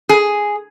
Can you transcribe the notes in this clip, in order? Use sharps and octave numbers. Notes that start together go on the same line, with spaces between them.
G#4